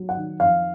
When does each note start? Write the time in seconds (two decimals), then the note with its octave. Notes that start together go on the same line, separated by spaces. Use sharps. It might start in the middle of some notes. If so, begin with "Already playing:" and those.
Already playing: F#3
0.09 F#5
0.17 D#3
0.40 F2 F5